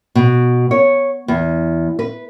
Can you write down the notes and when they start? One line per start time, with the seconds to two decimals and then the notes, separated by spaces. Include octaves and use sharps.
0.15 B2
0.71 C#5
1.28 E2
1.99 B4